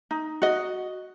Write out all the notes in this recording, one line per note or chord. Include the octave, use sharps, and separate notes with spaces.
D#4
F#4 D#5